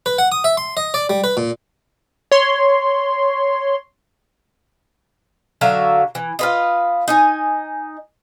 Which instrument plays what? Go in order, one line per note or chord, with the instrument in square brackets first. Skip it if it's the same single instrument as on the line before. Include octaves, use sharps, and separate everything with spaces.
[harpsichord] B4
F#5
D#6
E5
C6
D#5
D5
G3
B4
A#2
[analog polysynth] C#5 C6
[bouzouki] D3 F#3 E5 F5
E3
F4 B4 D#5
D#4 D#5 G#5